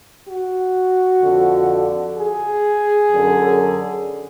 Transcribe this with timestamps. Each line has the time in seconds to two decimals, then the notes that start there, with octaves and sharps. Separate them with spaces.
0.29 F#4
1.23 F2 D3
2.18 G#4
3.13 F#2 D3